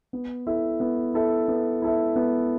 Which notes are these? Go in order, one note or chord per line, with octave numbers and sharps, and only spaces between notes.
B3
E4 A4 E5
B3
E4 A4 E5
B3
E4 A4 E5
B3